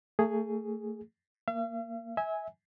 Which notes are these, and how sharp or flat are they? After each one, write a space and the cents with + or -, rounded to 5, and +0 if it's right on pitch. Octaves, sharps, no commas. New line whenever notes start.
A3 +30 G#4 +0
A#3 +0 F5 -45
E5 -30 G#5 +0